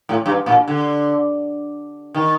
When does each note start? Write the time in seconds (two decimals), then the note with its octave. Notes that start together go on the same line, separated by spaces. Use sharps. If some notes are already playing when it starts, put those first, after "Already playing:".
0.09 A2
0.26 G2
0.46 A#2
0.68 D3
2.15 D#3